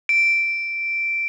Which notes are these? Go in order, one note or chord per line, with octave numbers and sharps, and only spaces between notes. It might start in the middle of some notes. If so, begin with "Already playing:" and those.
D7